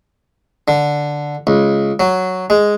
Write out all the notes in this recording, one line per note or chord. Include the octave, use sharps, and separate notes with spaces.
D3
C#2
F#3
G#3